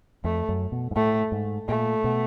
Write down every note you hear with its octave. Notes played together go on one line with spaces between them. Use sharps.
F2 A3
F#2
B2
G#2
A2 A3
G#2
A#2 A3
B2